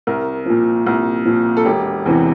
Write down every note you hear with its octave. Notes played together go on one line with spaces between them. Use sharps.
C2 A#4
A#2 F3
C2
A#2 F3
A4
E1 G4
E2 C3 E3